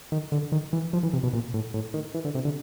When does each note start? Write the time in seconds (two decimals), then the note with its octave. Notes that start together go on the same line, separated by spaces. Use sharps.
0.12 D#3
0.32 D3
0.52 D#3
0.73 E3
0.93 F3
1.03 E3
1.13 C3
1.23 B2
1.33 A#2
1.54 A2
1.74 A2
1.94 D#3
2.14 E3
2.25 D3
2.35 C3
2.45 D3